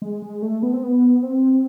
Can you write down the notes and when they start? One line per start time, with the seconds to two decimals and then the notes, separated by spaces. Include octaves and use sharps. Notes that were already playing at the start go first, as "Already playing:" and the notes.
0.02 G#3
0.22 G#3
0.42 A3
0.63 B3
0.73 C4
0.83 B3
1.23 C4